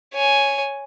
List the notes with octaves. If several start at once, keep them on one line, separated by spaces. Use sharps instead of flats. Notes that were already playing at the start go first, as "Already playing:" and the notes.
C#5 G#5